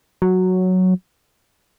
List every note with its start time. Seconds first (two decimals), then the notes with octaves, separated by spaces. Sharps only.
0.22 F#3